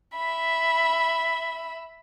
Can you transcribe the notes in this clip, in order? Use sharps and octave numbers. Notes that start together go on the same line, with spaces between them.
E5 B5